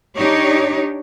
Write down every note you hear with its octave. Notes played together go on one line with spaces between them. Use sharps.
D4 D#4 G4 C#5 D5